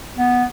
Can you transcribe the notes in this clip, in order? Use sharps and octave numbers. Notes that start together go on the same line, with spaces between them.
B3